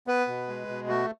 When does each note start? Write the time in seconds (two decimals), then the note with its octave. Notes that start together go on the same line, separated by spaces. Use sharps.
0.07 B3 B4
0.27 B2
0.48 G#3
0.68 B2
0.88 A3 F#4